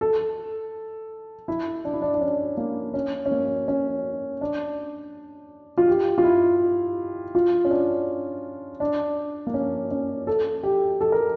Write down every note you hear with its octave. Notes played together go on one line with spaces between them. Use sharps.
A4
E4
D4
E4
D4
D4
C#4
A#3
C#4
C#4
A#3
C#4
D4
F4
G4
F4
E4
F4
C#4
D4
D4
A#3
C#4
C#4
A4
G4
A4
A#4